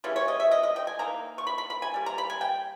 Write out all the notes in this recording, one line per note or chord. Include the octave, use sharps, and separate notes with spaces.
C#3 E3 G3 C#4
C#5
D#5
E5
D#5
D#5
G5
G#5
E3 A#3 D#4 A#5
C#6
B5
B5
B5
G#5
G3 A#3
A#5
B5
G#5
G5